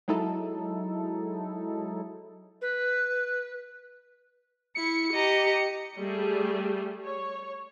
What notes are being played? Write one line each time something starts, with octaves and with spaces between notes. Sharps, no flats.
F#3 G#3 D#4 E4 A4
B4
E4 C#7
G4 D#5 A#5
G3 A3 G#4
C#5